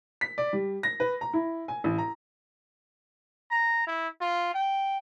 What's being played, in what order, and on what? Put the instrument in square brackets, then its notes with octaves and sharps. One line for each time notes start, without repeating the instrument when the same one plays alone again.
[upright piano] B6
D5
G3
A#6
B4
A#5
E4
G#5
A1
A#5
[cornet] A#5
E4
F4
G5